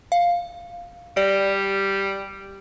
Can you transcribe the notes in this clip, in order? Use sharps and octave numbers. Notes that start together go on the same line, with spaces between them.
F5
G3 D5